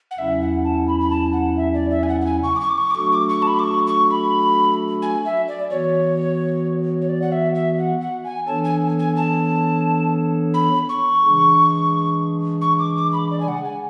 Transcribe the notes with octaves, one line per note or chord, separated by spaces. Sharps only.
F#5
E2 C#3 F#3 C#4 E4 E5
F#5
A5
B5
B5
A5
F#5
E5
D5
E5
G#5
F#5
F#5
G#5
C#6
D6
C#6
D6
C#6
D6
F#3 A3 D4 F#4 A4 C#6
D6
C#6
A5
B5
D6
C#6
C#6
B5
G#5
E5
D5
E3 B3 F#4 C#5
C#5
D5
F#5
E5
E5
F#5
F#5
G#5
E3 B3 D4 A4 C#5 A5
G#5
G#5
A5
B5
C#6
C#3 E3 G#3 D4 G#4
C#6
D6
D6
B5
D5
G#5
F#5
G#5